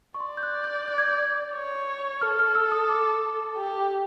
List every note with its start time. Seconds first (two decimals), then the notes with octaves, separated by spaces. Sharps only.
0.15 C#6
0.19 D5 C6
0.37 G6
0.43 F#6
0.64 G6
0.88 G6
0.98 G#6
1.08 G6
1.55 C#5
2.21 A4 F6
2.39 F6
2.55 E6
2.72 D#6
2.89 D6
3.57 G4